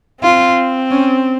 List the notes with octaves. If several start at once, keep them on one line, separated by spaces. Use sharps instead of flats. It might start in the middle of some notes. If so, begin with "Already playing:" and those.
C4 F4
C#4